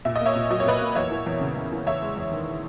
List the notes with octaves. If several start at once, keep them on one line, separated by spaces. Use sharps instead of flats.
A#2 E5
D#5
A#3
C#5 E5
A#2
F#3 D#5
C#5
A#2 B4 D#5
A#3
E2 C#5 E5
E3
E2
C#3
E2
E3
E2 C#5 E5
G#3
E2
D#3